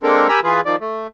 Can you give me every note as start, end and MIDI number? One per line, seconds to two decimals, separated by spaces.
0.03 0.28 56
0.03 0.28 58
0.03 0.28 60
0.03 0.28 62
0.03 0.28 69
0.03 0.28 70
0.29 0.40 67
0.29 0.40 70
0.29 0.40 80
0.29 0.40 82
0.29 0.40 83
0.29 0.40 88
0.44 0.61 52
0.44 0.61 65
0.44 0.61 68
0.44 0.61 71
0.66 0.76 51
0.66 0.76 53
0.66 0.76 74
0.81 1.07 57